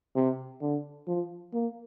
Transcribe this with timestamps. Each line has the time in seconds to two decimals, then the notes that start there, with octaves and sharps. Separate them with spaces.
0.16 C3
0.61 D3
1.08 F3
1.53 A#3